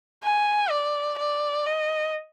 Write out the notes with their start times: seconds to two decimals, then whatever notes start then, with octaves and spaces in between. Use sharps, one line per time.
0.23 G#5
0.70 D5
1.18 D5
1.66 D#5